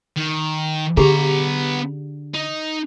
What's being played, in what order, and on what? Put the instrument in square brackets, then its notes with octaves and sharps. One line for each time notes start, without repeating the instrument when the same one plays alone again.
[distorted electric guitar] D#3
[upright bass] D3 [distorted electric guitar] B3 A#5 [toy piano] G4 G#4
[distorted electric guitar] D#4